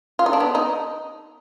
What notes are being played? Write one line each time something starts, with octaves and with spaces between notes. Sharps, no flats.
F4
D#4
D4
B3
D#4